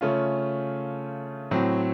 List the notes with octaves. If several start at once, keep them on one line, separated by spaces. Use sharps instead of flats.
C#3 A3 C#4 F4
A2 F#3 C4